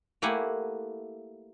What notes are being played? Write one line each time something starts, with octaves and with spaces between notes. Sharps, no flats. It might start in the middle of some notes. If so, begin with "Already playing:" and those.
A3 A#3 E4 G4 F#5 G#5